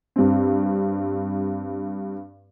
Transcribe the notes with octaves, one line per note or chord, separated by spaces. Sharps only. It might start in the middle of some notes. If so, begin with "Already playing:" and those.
G2 C4